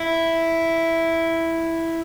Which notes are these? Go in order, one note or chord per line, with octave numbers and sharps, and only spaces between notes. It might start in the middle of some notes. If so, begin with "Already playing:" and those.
Already playing: E4